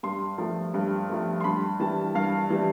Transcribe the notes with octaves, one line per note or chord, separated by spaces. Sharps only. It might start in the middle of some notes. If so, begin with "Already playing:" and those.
G2 C6
F3 A3
G2
F3 A3
C6
G2 B5
E3 G3 A5
G2 F5
E3 G3